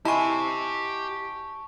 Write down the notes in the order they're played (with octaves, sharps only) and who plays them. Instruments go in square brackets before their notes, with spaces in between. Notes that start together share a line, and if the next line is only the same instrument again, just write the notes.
[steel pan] E4 [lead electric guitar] G4 C6 [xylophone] D#5 G#5 [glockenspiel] A5 C#6